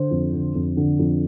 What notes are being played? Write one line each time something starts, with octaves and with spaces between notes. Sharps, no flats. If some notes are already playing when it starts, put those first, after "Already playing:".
Already playing: D3 C5
F2
D3
F2
D3
F2